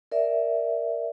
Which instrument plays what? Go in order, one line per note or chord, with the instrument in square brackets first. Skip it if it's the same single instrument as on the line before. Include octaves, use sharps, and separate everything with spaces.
[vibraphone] A#4 D5 E5